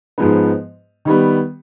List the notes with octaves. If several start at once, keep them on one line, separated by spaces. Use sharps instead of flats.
G#2 F3 G#3 B3
D#3 G3 B3